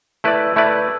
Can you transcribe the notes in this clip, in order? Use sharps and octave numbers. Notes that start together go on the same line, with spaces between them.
A3 E4 B4 D5
A3 E4 B4 D5